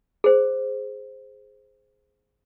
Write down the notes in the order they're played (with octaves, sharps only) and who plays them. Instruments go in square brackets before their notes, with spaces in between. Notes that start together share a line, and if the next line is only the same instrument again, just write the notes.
[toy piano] G#4 C5